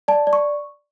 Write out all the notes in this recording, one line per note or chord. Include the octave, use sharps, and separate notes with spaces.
D5 A5
D5
C#6